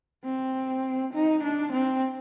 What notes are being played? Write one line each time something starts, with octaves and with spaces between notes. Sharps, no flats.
C4
D#4
D4
C4